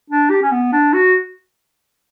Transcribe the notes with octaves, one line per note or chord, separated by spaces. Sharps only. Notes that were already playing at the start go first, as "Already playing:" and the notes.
D4
G4
C#4
B3
D4
F#4